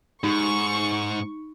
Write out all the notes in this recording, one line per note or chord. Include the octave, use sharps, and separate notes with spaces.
G#2 D#4 C#6